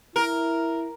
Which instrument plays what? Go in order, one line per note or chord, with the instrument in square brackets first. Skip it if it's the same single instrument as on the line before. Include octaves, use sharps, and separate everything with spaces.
[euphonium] E4 [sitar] A#4